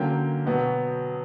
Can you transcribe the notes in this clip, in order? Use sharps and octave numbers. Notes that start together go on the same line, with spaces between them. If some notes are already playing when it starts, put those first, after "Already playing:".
Already playing: D3 F#3 A#3 C#4 G5
B2 F#3 B3